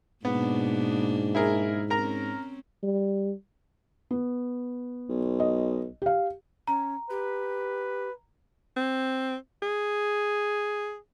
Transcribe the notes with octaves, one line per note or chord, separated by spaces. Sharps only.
G#2 B2 A#3 B3 D4
E4 G#4 A#4
C4 C#4 A#4 A#5
G3
B3
B1
D#5
G4 F5
C#4 A#5
G4 B4
C4
G#4